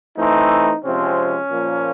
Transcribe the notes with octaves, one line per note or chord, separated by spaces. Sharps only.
E3 A3 C4 D#4
C3 F3 G#3 C4 C#4
A#2 F3 A#3